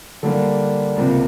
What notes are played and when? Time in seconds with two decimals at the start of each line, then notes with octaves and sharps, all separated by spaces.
0.23 D3 G3 A#3 D4
0.96 C#2 C3 F3 A#3